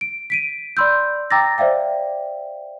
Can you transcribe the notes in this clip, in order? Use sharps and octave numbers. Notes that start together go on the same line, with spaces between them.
D7
B6 D7 D#7
D5 B5 C6 E6 G6
G5 A#5 D6 E6 A6 A#6
C5 D5 E5 F5 G5